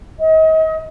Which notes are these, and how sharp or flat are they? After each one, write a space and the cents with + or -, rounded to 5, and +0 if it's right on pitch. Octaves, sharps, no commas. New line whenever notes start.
D#5 +35